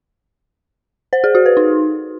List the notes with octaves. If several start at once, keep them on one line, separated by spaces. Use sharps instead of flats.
C5
G#4
F#4
B4
D#4